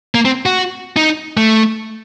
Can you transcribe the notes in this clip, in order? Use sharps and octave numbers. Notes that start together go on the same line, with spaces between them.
A#3
C4
F#4
D#4
A3